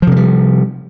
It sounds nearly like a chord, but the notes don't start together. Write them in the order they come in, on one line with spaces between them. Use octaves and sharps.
F3 C3 G#3 G3